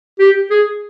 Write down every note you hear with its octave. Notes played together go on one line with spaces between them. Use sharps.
G4
G#4